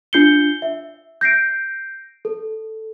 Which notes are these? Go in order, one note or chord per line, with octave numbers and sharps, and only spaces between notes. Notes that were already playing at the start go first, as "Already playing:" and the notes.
D4 F4 G6 C7 C#7 G7
E5
G6 A#6 C7 D7
A4